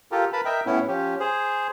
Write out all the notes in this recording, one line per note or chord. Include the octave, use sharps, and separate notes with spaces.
F4 G4 A4 A#4
A#4 B4 A5 B5
A#4 D#5 E5 G5
A2 B3 C#4 E4
F3 C#4 G4
G#4 C5